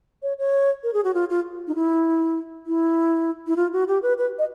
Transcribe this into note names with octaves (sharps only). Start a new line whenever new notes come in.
C#5
C#5
A#4
G#4
F#4
F4
F4
D#4
E4
E4
E4
F4
F#4
G4
B4
B4
D#5